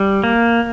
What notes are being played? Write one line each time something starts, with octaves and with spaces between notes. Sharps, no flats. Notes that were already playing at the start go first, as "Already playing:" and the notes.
Already playing: G3
A#3